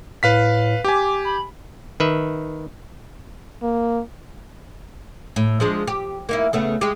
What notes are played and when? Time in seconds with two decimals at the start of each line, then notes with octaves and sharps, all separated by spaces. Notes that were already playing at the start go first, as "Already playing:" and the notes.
0.23 A2 B4 F5 B6
0.84 G4 G#5 D6
1.25 B5
2.00 D#3 B4 E5
3.62 A#3
5.36 A2
5.60 F3 G#3 D4
5.88 G4
6.29 A#3 D#4 E4
6.53 C#3 A3 B3
6.81 G#3 G4